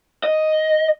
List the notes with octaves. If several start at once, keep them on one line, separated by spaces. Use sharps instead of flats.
D#5